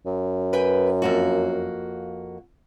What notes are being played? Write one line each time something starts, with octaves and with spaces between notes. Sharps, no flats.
F#2
B4 G5 G#5
F2 A#3 F#4